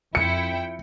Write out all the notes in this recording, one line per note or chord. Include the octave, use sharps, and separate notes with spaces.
F2 E4 G5 C#7